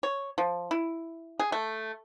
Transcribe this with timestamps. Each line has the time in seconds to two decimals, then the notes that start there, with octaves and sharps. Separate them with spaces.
0.03 C#5
0.38 F3
0.71 E4
1.40 G#4
1.52 A3